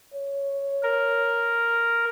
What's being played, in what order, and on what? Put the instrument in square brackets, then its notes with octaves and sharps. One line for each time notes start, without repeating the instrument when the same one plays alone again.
[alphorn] C#5
[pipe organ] A#4